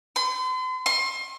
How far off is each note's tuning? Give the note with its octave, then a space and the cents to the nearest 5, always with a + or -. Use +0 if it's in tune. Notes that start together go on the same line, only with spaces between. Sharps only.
C6 -40
C6 +35